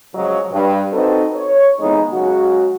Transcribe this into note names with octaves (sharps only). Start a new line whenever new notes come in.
C#3 F3 F#3 G#3 C#5 D#5
G2
C4 D#4 F#4 A4 B4 C5
C#5
F2 E3 G#3 B3 D#4
C#3 F#3 G#3 F#4